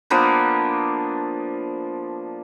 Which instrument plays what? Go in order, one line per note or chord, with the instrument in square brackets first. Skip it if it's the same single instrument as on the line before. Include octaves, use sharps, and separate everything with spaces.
[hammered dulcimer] F3 A#3 B3 D4